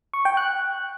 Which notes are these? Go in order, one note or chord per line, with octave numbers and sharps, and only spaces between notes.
C#6
G5
F#6